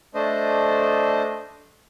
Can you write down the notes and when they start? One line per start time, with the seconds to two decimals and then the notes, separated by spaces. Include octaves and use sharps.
0.14 A3 D4 C5 D#5